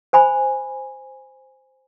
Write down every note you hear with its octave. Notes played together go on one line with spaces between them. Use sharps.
C5 G#5 B5